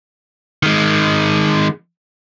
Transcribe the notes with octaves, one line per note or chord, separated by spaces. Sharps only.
D#3 G#3